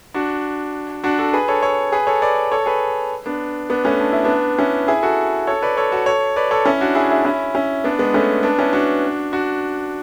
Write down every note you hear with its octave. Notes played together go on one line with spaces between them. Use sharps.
D4 F#4
D4 F#4
F#4 A4
G#4 B4
A4 C#5
A4 C#5
G#4 B4
A4 C#5
B4 D5
A4 C#5
G#4 B4
B3 D4
B3 D4
A3 C#4
D4
E4
B3 D4
C#4 E4
E4 G#4
F#4 A4
A4 C#5
B4 D5
A4 C#5
F#4 A4
A4 C#5
B4 D5
A4 C#5
C#4 E4
D4 F#4
E4 G#4
E4 G#4
D4
C#4 E4
C#4 E4
B3 D4
G#3 B3
A3 C#4
B3 D4
C#4 E4
D4 F#4
D4 F#4